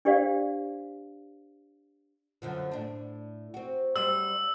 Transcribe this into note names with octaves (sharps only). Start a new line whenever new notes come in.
D4 G4 C5 D5 F5
F#2 D3 F3
A2 D4
C4 F#4
F#2 G3 C5 E6